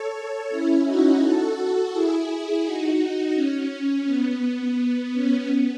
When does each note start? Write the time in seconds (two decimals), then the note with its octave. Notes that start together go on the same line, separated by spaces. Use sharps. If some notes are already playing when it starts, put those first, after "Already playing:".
Already playing: A4 C#5
0.50 C#4 E4
0.86 D#4 F#4
1.21 F#4 A4
1.92 E4 G#4
2.63 D#4 F#4
3.35 C#4
4.06 B3
5.13 C#4
5.48 B3